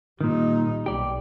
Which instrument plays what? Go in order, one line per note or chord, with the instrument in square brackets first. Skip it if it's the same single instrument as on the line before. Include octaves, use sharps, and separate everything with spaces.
[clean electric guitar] A#2 D#3 [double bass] G3 D#4
[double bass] B1 [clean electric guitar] G4 D5